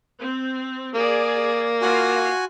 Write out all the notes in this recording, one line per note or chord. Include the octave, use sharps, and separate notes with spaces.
C4
A#3 G#4 D5
F4 F#4 G#5